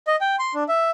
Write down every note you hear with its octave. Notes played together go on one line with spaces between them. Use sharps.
D#5
G5
C6
D4
E5